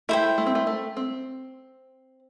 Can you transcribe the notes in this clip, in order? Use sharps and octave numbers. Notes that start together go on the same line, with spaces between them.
A3 E4 C5 G5
A3
C4
A3
A3
C4